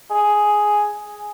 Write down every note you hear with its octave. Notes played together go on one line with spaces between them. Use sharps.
G#4